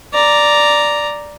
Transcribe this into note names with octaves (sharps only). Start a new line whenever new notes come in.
D5 A#5